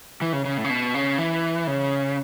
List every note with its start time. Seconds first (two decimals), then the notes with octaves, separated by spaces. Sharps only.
0.22 E3
0.33 C#3
0.45 C#3
0.58 A2
0.64 C#3
0.70 B2
0.94 C#3
1.18 E3
1.67 C#3